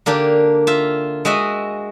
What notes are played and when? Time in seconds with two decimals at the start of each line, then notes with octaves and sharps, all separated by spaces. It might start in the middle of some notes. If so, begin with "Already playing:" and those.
0.06 D3 A#3 D4 G4
0.67 F4 E5
1.25 G#3 F#4 D#5 E5